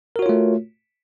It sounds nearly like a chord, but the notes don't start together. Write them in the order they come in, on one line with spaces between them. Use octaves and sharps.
A#4 F#4 C#5 F4 A3